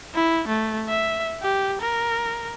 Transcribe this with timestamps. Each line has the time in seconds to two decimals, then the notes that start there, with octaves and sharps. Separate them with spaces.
0.14 E4
0.48 A3
0.89 E5
1.42 G4
1.82 A#4